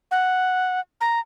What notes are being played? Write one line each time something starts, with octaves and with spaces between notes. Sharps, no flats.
F#5
A#5